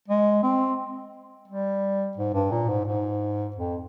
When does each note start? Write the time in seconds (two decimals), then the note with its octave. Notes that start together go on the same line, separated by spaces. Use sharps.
0.08 G#3
0.43 C4
1.48 G3
2.17 G#2
2.34 G2
2.51 A#2
2.69 G#2
2.86 G#2
3.56 F2